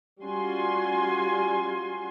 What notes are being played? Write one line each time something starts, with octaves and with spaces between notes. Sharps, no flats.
G3 C#4 F4 F#4 G#5 C6